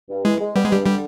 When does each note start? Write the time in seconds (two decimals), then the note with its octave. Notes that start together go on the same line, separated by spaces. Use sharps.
0.09 G2
0.25 E3 G#3
0.40 G#3
0.56 G3 B3
0.64 G#3
0.71 G2 G3
0.86 D3 G3